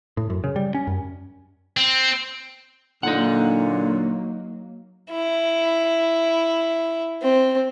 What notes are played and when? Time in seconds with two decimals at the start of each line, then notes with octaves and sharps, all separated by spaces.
0.17 A2
0.30 F#2
0.44 C#3
0.56 G3
0.75 C#4
0.87 F#2
1.77 C4
3.03 A#2 D3 F#3 A#3 D#4 F#5
5.11 E4
7.22 C4